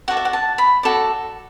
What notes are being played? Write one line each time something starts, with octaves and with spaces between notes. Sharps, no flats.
F#4 A4 D5 F#5
E5
F#5
A5
B5
F#4 A4 D5